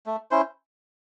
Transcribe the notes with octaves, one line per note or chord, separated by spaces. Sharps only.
A3
C#4 E4 C5